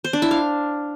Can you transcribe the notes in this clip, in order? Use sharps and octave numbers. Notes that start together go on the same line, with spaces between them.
C5
D4
E4
F5